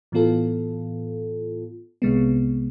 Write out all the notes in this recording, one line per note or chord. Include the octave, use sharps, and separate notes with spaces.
A2 E3 B3 F4 A4
C2 C3 G#3 B3